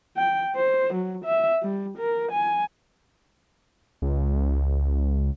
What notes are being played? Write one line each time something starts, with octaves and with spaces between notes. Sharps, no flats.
G5
C5
F#3
E5
G3
A#4
G#5
C#2